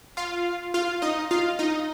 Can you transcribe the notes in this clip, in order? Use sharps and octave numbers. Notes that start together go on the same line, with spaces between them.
F4 F5
F4 F5
D#4 D#5
F4 F5
D#4 D#5